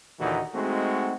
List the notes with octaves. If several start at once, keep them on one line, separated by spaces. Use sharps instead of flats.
D#2 A#2 D3 E3 D#4 F#4
G#3 A3 C4 D#4 F#4